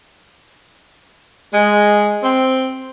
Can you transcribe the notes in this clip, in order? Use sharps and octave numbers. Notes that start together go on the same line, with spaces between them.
G#3
C4